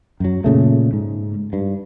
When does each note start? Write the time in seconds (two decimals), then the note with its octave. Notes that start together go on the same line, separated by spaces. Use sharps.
0.20 F#2 F#3
0.44 A#2 C#3 A3
0.93 G#2
1.53 G2